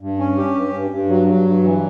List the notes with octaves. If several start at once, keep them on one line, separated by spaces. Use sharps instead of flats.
G2
C#4
G4
G2
G2
G2
F#3
F#3
G2
E3